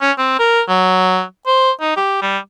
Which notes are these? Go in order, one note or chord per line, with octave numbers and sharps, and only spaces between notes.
C#4
C4
A#4
F#3
C5
D#4
G4
G3